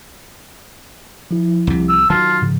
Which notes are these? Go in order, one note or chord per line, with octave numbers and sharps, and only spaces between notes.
F3 E4
C2 C3
E6
D#3 F#3 F4 A5
G#2 C#3 F3